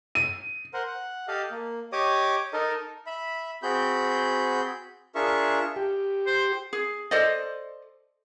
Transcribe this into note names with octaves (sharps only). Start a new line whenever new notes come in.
D#7
A#4 C5 F#5
F#5
G4 A4 D#5 F5
A#3
G4 C#5 D#5 D6 D#6
D#4 A4 A#4 D#5
E5 B5
C4 F#4 G#4 B5 G6
D4 F4 G#4 A#4 E5 C#6
G4
C5
G#4
A4 C5 D5 D#5